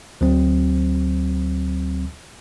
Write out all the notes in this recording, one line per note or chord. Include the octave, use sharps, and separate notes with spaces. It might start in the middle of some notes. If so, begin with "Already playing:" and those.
D2 F#3 C4